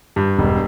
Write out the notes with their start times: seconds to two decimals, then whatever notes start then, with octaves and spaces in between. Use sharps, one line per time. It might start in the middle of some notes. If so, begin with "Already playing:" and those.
0.16 G2
0.38 E1